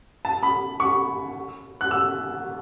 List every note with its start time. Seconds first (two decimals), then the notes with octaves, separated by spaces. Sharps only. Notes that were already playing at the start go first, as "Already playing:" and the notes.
0.25 A5
0.43 B5
0.80 C#6
1.81 F#6
1.91 E6